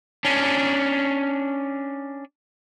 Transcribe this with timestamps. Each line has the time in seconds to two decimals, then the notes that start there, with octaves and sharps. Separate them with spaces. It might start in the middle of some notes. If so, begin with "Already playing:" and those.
0.25 C#4 D4